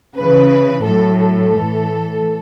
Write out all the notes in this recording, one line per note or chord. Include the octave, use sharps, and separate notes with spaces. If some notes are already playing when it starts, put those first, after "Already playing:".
C#3 E3 B4
A2 F#3 A4
A4
A2 E3